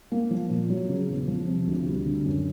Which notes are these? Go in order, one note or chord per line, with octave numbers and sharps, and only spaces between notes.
A#3
F3
A#2
F#3
C#3
E2
F3
C3
D2
G3
D3
F#2